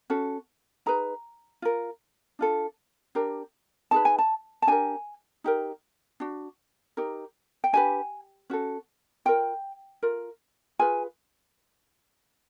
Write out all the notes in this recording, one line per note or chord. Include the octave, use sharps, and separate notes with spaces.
C#4 F#4 A4
D#4 G#4 B4 A#5
F4 A#4
D4 F4 A4
D4 G4 A#4
D#4 G#4 B4 A5
G#5
A5
A5
D4 G4 A#4 G#5
D#4 G4 A#4
D4 F#4
D#4 G4 A#4
G5
D4 G4 B4 G#5
C#4 F#4 A4
F4 A#4 G5
F4 A#4
F4 G#4 B4 G#5